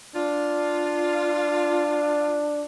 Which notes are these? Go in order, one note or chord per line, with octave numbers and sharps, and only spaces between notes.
D4 F4